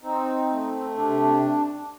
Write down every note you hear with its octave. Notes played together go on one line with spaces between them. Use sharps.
C4 D#4
A3
C3 D4